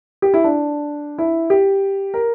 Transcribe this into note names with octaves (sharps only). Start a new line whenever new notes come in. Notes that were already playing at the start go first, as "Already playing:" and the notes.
G4
E4
D4
E4
G4
A#4